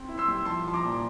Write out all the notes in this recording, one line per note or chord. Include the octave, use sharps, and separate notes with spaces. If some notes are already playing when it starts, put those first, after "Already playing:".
Already playing: C4
E4
C6 E6
G3
F3 A5 C6
F3 C6
A#5 D6
A#2